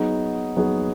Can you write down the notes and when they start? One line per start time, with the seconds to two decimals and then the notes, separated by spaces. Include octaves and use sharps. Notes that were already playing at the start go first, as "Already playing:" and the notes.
Already playing: F#3 B3 D#4 G#4
0.57 F#3 B3 D#4 G#4